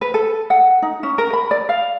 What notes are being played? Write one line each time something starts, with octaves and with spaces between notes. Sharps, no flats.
B4
A4
F#5
D#4
C#4
A#4
B5
D5
F5